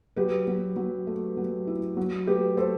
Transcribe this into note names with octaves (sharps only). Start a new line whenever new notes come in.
F#3 G4 B4
F#3
F#3
A3
F#3
E4
F#3
A3 G4 B4
A3 A4 C5